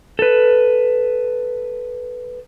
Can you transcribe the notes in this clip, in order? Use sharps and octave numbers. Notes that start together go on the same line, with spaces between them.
A4 B4